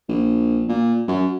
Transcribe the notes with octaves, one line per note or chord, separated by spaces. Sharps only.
A#1
A#2
F#2